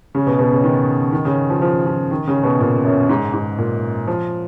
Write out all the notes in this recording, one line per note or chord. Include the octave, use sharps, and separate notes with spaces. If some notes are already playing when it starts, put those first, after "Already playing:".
C#3
B2
B2
C#3
D#3
D#3
C#3
F3
F3
F3
D#3
C#3
B2
A#2
F#2
G#2
G#2
A#2
F3